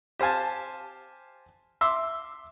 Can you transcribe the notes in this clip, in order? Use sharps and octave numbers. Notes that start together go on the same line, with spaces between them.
G4 C5 F5 G#5 A5
E5 C6 D6 E6